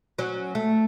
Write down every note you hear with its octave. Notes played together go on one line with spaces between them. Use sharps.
F#3 C#4
A3